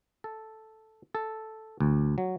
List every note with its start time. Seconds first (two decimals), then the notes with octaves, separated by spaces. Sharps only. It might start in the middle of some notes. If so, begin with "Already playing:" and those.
0.24 A4
1.15 A4
1.80 D2
2.18 F#3